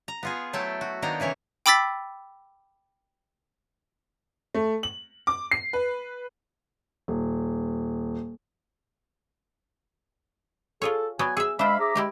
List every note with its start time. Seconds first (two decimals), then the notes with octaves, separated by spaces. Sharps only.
0.08 A#5
0.23 B3 F4 G#4
0.53 F#3 A3 E4 G5 A5
0.81 F#4
1.02 D#3 A#3 B3 D4 G5 A#5
1.20 C#3 E3 E4 C#5
1.66 G5 B5 D6 E6 A6 B6
4.55 A3
4.83 F#7
5.27 D6
5.51 C7
5.73 B4
7.08 D#1
10.82 F4 G#4 A4 C#5
11.19 F#3 B3 D5 G#5
11.37 G#4 E5 E6
11.59 G#3 D4 C5 E5 F5 B5
11.80 G#4 E5 A#5 D6
11.95 G#3 E4 G4 A#4